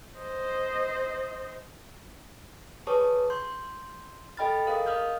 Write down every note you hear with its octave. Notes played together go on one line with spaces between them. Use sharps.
C5 D#5
G#4 B4 C#5 A5 C#6 D#6
C6 G6
A4 D#5 G5 B5 F6 A6
G#4 A#4 F5 F#5 D#6
D#5 F5 D#6 F6 G6